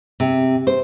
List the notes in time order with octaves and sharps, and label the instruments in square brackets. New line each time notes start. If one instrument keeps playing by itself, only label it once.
[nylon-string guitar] C3
C5